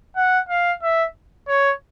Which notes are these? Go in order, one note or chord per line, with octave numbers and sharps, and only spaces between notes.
F#5
F5
E5
C#5